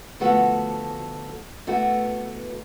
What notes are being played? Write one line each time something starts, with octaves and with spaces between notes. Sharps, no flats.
D2 F3 A3 B3 F#4 A4
E3 A3 B3 F#4